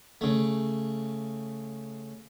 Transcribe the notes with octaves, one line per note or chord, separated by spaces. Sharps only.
C#3 A3